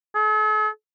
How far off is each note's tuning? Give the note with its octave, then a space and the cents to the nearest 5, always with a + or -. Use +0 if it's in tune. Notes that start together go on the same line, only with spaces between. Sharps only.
A4 -45